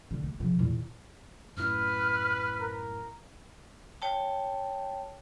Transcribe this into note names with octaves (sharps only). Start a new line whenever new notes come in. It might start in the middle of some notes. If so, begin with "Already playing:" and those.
D3
A#3
C#3 F3
E2 A#2
F#2 A2 E4 B4 F6
A#4
C#5 G5 A5